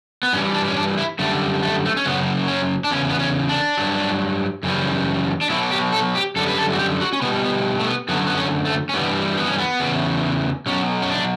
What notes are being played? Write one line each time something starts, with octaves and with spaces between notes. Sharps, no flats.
B3
G2 E3 G3 C#4
D4
C#4
D4
E4
F#2 D3 G3 A3
A3
A3
C#4
F#2 C#3 F#3 B3
C#4
D4
E2 C#3 C#4
B3
C#4
D4
G2 F#3
F#2 C#3 E3 G3
D4
B2 F#3 E4
G4
A4
G4
F#2 D3 G3 A4
B4
A4
F#4
G4
F#4
C#4
B2 G3 B3
B3
A3
B3
F#2 D3 F#3 B3
B3
C#4
A3
C#4
G2 E3 G3 B3
B3
C#4
B3
E2 C#3 E3
B2 F#3 C#4
C#4
D4